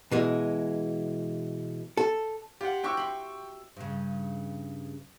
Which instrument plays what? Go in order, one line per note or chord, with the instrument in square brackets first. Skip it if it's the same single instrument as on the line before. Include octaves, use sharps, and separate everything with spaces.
[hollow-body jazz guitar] B2 E3 G#3
A4
[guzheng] F4 [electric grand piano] G4 F#5
[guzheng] E4 F#4 G4 [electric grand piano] G5 C#6 E6
[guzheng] B5 C6
[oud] G2 C#3